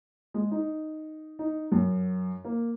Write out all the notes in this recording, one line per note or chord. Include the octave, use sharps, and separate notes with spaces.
G#3
D#4
D#4
F#2
A#3